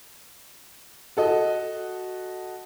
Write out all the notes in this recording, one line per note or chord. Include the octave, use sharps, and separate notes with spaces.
F#4 A4 D#5